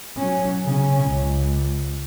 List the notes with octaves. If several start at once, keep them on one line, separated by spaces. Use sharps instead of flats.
F#3 C#4
C#3 C#4
C#2